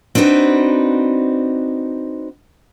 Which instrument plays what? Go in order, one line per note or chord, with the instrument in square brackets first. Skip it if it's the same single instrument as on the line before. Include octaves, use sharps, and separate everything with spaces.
[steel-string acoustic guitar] C4 D4 D#4 F#4 B4